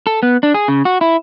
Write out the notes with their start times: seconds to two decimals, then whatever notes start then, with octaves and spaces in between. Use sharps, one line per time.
0.07 A4
0.23 B3
0.43 D4
0.54 G#4
0.68 C#3
0.85 F#4
1.01 E4